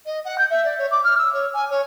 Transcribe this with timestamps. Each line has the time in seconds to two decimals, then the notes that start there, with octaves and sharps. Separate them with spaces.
0.06 D#5
0.25 F#5
0.38 G6
0.50 E5
0.65 D5
0.78 C#5
0.91 D6
1.04 F6
1.18 E6
1.33 C#5
1.54 G#5
1.70 C#5